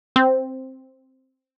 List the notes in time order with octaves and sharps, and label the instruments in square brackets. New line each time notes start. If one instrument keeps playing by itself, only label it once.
[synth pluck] C4